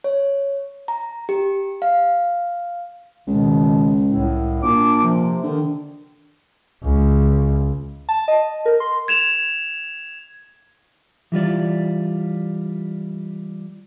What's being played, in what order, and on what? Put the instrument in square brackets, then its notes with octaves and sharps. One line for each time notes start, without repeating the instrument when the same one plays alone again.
[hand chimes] C#5
A#5
G4
F5
[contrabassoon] C#2 [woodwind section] B2 D#3
[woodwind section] C2 A2
[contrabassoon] A#2 [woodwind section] D4 D6
[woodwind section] C3 F3
[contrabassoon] D3 [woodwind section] D#3
[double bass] C#2
[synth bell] A5
D#5
A#4
C6
[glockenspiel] G#6 E7 F7
[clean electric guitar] E3 G3 F4 D5